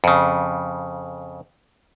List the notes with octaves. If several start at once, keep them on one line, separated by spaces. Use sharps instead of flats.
F2 C#3